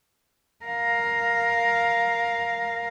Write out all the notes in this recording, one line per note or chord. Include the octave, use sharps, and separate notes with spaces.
A#4 F5